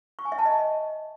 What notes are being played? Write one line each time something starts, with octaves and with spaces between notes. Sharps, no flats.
C#6
G#5
E5
A5
D#5